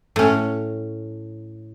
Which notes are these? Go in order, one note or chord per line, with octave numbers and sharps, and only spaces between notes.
A2 C#4